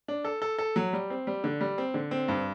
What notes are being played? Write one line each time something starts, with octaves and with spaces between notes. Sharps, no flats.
D4
A4
A4
A4
F#3
G3
C4
G3
D3
G3
C4
D3
C4
G2